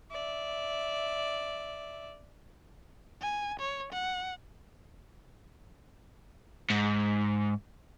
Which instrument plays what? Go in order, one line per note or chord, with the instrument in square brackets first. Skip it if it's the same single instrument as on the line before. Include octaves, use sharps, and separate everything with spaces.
[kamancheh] D5 E5
[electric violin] G#5
C#5
F#5
[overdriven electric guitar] G#2